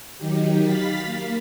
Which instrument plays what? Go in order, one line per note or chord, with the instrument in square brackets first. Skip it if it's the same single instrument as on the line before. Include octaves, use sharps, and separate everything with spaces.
[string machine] D#3 F#3 D#4 G4
F5 B5 A6 B6
A#3